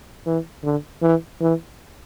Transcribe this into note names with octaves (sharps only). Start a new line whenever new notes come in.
E3
D3
E3
E3